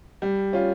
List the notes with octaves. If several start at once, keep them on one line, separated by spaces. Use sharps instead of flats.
G3
C#4 F4